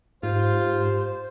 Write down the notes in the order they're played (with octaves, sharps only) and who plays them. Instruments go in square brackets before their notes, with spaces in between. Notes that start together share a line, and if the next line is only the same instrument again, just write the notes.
[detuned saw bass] G#2 [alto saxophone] F4 [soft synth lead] G4 [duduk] C5